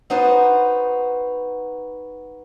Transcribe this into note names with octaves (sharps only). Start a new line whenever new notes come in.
B3 D#4 F#4 C5 A5